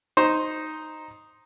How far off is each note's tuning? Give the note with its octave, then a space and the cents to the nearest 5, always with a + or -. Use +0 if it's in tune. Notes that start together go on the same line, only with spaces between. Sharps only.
D#4 +0 C5 +0